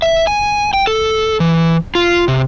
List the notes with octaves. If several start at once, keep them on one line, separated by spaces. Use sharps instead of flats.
E5
G#5
G5
A4
E3
F4
C3